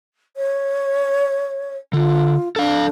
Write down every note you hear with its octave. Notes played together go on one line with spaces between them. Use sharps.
C#5
D3 F4
D4 A4 F5